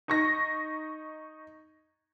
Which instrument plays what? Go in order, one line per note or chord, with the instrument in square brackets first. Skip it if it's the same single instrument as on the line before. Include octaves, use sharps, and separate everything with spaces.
[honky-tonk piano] D#4 C#6 A#6